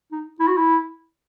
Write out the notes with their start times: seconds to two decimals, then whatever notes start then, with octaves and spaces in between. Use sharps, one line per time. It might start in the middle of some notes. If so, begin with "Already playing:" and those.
0.12 D#4
0.40 E4
0.48 F#4
0.57 E4